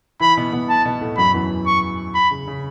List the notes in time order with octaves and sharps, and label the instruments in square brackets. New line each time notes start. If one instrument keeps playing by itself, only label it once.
[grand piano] E3 E4 [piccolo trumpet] B5
[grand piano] B2 B3
B2 B3
[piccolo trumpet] A5
[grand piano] B2 B3
A2 A3
[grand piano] F#2 F#3 [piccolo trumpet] B5
[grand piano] E2 E3
[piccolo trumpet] C#6
B5
[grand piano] C#3
C#3